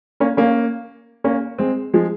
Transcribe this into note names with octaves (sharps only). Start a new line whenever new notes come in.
A#3 C#4
A#3 C#4
A#3 C#4
G#3 C4
F3 G#3